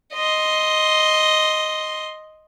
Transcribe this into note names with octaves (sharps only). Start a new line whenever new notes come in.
D#5 C6